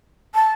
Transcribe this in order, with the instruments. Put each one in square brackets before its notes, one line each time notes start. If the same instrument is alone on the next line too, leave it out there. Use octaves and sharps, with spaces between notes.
[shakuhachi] A5